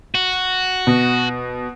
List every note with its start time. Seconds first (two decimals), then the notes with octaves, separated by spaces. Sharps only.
0.15 F#4
0.87 B2